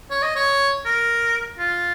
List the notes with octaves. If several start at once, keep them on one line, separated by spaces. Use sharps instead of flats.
C#5
D#5
C#5
A#4
F4